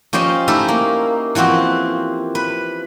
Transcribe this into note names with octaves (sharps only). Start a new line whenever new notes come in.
F3 C#4 G4 C5 D#5 G5
A3 D#4 E4 G4 A4 E5
A#3
E3 F3 C4 F#4 G4
B4